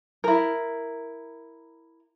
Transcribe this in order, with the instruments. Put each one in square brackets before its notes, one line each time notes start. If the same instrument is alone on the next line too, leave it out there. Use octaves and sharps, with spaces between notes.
[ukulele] E4 A#4